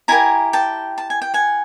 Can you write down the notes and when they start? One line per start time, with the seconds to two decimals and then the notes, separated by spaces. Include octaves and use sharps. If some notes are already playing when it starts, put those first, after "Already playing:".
0.08 E4 G4 A#4 G#5 A#5
0.53 G5 A5
0.98 A5
1.10 G#5
1.22 G5
1.34 F#5 G#5